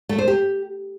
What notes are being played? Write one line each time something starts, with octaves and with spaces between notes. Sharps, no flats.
A3
C5
G4